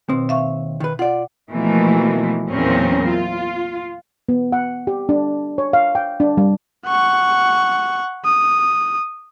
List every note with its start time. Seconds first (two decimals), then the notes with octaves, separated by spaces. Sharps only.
0.09 D#2 B2 C4
0.29 E5 F5 C#6
0.80 D#3 B4
0.99 F4 D5 F#5
1.51 B2 E3 F3 A3 A#3
2.49 E2 A#2 F#3 C4 C#4 A#4
3.09 F4
4.29 B3
4.52 F#5
4.87 G4
5.09 D4
5.58 C#5
5.73 F5
5.95 G5
6.20 D4
6.37 G3
6.86 F#5 C#6
8.25 D#6